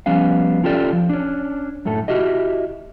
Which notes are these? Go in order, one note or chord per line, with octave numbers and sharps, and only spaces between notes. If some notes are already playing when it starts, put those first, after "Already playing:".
F3 G3 B3 C#4 F5
C#4 F4 G4 A4 C5 D5
F3
C#4 D4
F#2 A2 A3 A4
E4 F#4 G4 D#5